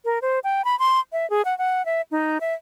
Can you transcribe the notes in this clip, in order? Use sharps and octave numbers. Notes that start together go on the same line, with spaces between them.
A#4
C5
G5
B5
C6
E5
G#4
F#5
F#5
E5
D#4
E5